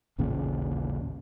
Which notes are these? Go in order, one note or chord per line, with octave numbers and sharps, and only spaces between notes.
A1 D#2 A#2 C#3